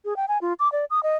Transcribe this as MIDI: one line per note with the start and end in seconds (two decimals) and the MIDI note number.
0.05 0.16 68
0.16 0.26 79
0.28 0.38 80
0.41 0.53 65
0.60 0.71 86
0.72 0.85 74
0.90 1.03 87
1.03 1.17 75